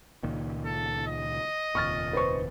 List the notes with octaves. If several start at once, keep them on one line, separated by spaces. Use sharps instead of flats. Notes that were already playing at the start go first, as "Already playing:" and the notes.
C#2 A#2 D#3
A4
D#5
F1 D#2 A#2 C#6 F6 A6
B4 C5 C#6